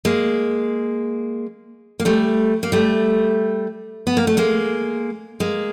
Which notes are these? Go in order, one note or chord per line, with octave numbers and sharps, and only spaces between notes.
G#3 A#3
A#3
G3 A3
A#3
G3 A3
B3
A#3
A3
G#3 A#3
G#3 A#3